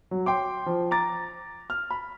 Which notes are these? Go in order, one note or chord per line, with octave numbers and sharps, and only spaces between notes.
F#3
G5 C6 D6
F3
A#5 D6 A6
F6
B5